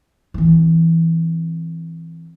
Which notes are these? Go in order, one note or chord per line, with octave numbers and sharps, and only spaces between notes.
E3 C4